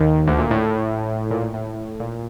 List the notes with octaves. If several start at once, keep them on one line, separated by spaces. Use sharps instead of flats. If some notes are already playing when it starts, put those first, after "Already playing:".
Already playing: D#2 D#3
D2 D3
A#2
A2
A#2
A2
A2
A#2